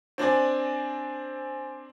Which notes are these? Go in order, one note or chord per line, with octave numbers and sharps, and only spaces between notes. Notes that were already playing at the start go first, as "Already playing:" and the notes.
C4 D4 C5 D5 G#5